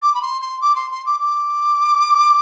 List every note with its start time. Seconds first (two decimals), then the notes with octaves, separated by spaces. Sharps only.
0.02 D6
0.15 B5
0.22 C6
0.42 C6
0.61 D6
0.76 C6
0.91 C6
1.06 D6
1.20 D6